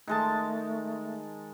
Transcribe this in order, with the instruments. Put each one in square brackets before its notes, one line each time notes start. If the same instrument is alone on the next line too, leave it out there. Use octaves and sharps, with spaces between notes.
[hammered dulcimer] D#3 G#3 A5 [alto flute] A3